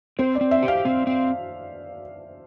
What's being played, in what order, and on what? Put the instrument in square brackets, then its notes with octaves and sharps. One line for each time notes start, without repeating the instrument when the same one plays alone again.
[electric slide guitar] C4 [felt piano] C5
[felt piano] D5
[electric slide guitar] C4
[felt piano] E5
[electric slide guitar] G4
[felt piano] F5
[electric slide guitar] C4
C4